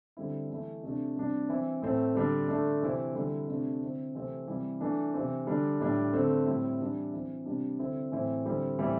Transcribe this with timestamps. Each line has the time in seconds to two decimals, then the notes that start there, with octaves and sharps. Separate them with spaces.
0.17 D3 G3 C4 E4
0.50 E3 A3 E4
0.83 C3 A3 D4
1.16 C3 G3 D4
1.49 E3 C4 E4
1.82 A2 A3 C4
2.15 D3 G3 D4
2.48 D3 A3 D4
2.82 C3 E3 C4 E4
3.15 D3 G3 E4
3.48 C3 A3 D4
3.81 D3 C4 E4
4.14 C3 E3 A3 C4
4.47 C3 E3 G3 E4
4.80 E3 A3 D4
5.14 C3 E3 C4
5.47 D3 G3 D4
5.80 A2 G3 D4
6.13 D3 A3 C4
6.46 A2 G3 C4 E4
6.79 E3 G3 D4
7.13 E3 C4 E4
7.46 C3 G3 D4
7.79 D3 C4 E4
8.12 A2 E3 C4 E4
8.46 D3 G3 C4 E4
8.78 A2 E3 G3 C4 E4